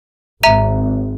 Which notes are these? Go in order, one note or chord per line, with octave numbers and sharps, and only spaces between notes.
G#1 E5 A#5 D#7